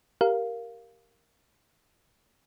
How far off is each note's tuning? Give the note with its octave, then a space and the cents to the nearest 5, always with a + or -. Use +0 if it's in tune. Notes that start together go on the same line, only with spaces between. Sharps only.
G4 +0 A#4 +0 F5 +0